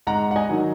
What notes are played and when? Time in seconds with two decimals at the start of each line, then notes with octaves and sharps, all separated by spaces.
0.07 G#2 F#5 A#5
0.31 F#5
0.36 D#5 G#5
0.49 D#3 F#3 D#4